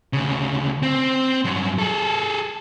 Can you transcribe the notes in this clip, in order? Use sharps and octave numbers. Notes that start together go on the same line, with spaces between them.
D2 C#3
C4
G2 F#3
G#4 A4